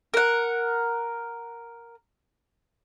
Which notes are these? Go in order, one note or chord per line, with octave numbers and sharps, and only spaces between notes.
A#4 F#5